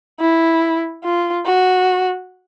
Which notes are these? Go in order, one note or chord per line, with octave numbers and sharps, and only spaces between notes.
E4
F4
F#4